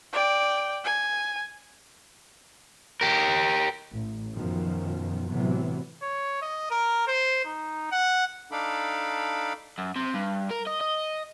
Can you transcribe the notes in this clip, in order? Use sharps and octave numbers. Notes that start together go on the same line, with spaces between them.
D5 G5
G#5
G4 A#4
A1
F#2 B2 D#3 F3
A2 C3 E3 F#3 B3
C#5
D#5
A#4
C5
D#4
F#5
D4 D#4 A4 F5 B5 D6
F#2
C3
G2
A#4
D#5
D#5